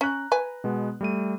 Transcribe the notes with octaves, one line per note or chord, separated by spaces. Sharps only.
C#4 A#5 F#6
B4 G#5
B2 G#3 B3
G3 A3 D#7